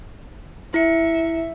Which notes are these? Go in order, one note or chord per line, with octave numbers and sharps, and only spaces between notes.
E4 E5 C#7